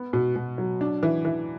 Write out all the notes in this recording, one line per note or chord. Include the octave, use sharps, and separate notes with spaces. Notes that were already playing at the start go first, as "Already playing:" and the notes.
Already playing: B3
B2
B2
F#3
D4
E3
E3